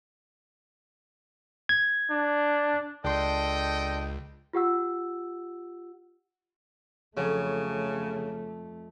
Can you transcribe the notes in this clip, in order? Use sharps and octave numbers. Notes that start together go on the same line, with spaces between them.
G#6
D4
C#2 D4 A4 D#5 G5 C6
F4 G4 F#5 E6
F2 C#3 F#3 A3